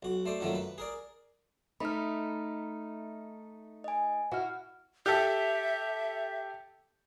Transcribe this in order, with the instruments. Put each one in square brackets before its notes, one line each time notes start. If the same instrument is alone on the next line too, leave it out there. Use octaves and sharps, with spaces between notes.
[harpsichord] B1 F#4
A3 C5 D5
F#2 D#3 F3 F#3 A3 A#3
B4
G#4 A#4 D5
[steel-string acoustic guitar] A3 D#4 [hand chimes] B5 F6
[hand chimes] D#5 G#5
[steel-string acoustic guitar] E4 F#4 [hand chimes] F#5 F6
[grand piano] G4 A4 [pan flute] E5